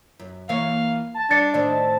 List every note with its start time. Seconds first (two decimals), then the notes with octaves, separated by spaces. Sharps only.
0.19 F#2
0.49 E3 A#3 C#5 F5
1.14 A5
1.31 G3 D4 D5 A6 C#7
1.54 A2 D#3 C4 D5